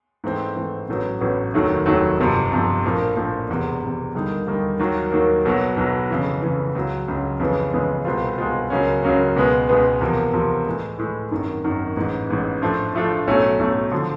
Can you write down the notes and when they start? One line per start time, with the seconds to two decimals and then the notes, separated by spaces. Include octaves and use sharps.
0.24 G#2 E3 A3 C4
0.56 G#2 E3 A3 C4
0.89 A1 A2 F#3 B3
1.21 A1 A2 F#3 B3
1.54 F1 D#2 D#3 F#3 A3
1.86 F1 D#2 D#3 F#3 A3
2.19 G1 F2 C3 F3
2.51 G1 F2 C3 F3
2.84 A#1 A2 F3 A#3
3.16 A#1 A2 F3 A#3
3.49 E1 E2 C3
3.82 E1 E2 C3
4.15 D#2 D3 G3 A#3 D#4
4.47 D#2 D3 G3 A#3 D#4
4.79 D#2 D#3 F#3 A#3
5.12 D#2 D#3 F#3 A#3
5.45 B1 B2 F#3
5.77 B1 B2 F#3
6.10 F2 C#3 E3
6.42 F2 C#3 E3
6.75 C#2 C#3 F#3
7.08 C#2 C#3 F#3
7.40 F2 C#3 E3 G#3 B3
7.73 F2 C#3 E3 G#3 B3
8.05 C2 B2 G#3 C4 F4
8.38 C2 B2 G#3 C4 F4
8.70 C#2 C#3 F#3 A#3 C#4
9.03 C#2 C#3 F#3 A#3 C#4
9.36 C#2 B2 G#3 B3
9.69 C#2 B2 G#3 B3
10.01 E2 C3 F3 A#3
10.34 E2 C3 F3 A#3
10.66 A2 E3 G#3
10.98 A2 E3 G#3
11.31 G#1 F#2 D#3
11.64 G#1 F#2 D#3
11.96 A1 G#2 E3
12.29 A1 G#2 E3
12.62 A2 F3 A3 D4 F4
12.95 A2 F3 A3 D4 F4
13.27 B1 A2 F#3 A3 C#4
13.59 B1 A2 F#3 A3 C#4
13.92 D3 F3